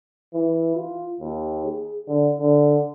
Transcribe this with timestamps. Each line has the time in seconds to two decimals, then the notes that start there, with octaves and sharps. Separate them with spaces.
0.34 E3
0.76 F4
1.20 D#2
1.65 G#4
2.08 D3
2.39 D3